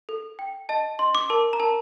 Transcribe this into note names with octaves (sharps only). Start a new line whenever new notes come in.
A4
G5
D#5 A5
D#5 C6
D6
A#4 A5
A#5
A#4 A5